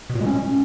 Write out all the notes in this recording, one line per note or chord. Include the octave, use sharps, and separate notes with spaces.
B2
A#2
G#3
C#4